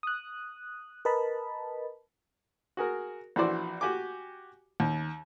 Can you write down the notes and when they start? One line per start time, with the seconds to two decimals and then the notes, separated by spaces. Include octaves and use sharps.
0.03 D#6 F#6
1.05 A#4 B4 D#5 A5 B5
2.77 F#4 G#4 A#4
3.36 A#1 E3 F#4 C5 D5 D6
3.81 F#4 G4 G#5 D6
4.80 D#2